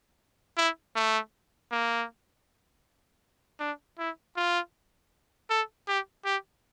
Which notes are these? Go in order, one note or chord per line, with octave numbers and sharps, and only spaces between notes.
E4
A3
A#3
D4
E4
F4
A4
G4
G4